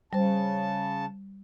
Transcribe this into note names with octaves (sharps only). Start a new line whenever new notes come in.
C#3 G3 C5 A5